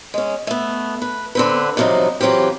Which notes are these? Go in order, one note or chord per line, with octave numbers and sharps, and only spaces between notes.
G#3 C#4
A3 B3
B4
D3 C4 B4
G2 C3 F3 F#3 D#4
E3 F#3 C4 F4 G4